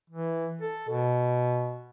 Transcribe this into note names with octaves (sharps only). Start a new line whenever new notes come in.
E3
A4
B2